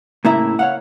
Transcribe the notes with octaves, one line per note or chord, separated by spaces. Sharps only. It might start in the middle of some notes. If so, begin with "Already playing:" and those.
A2 C#3 A#3 E4 E5 A#5
C#5 F5 F#5